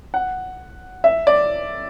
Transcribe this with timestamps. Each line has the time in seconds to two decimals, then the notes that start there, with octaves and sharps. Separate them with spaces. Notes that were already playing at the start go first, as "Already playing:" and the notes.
0.14 F#5
1.04 E5
1.27 D5